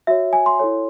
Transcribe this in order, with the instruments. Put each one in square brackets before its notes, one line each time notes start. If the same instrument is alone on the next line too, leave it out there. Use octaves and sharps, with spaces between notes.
[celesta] F#4 C#5 E5
G#5
C6
E4 A4 C#5